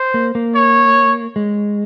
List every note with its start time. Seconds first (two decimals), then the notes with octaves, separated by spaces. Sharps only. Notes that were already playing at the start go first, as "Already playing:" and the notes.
Already playing: C5
0.14 A#3
0.35 A#3
0.55 C#5
1.36 G#3